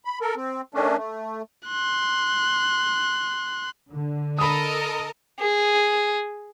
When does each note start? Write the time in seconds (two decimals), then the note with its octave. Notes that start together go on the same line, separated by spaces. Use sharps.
0.05 B5
0.21 A4 A#4
0.36 C4
0.74 D#3 A3 C#4 D4
0.97 A3
1.67 C6 F#6
3.92 D3
4.39 A4 A#4 D#5 B5 D#6
5.40 G#4